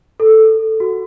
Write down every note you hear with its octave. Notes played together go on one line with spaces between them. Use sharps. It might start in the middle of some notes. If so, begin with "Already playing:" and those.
A4
F#4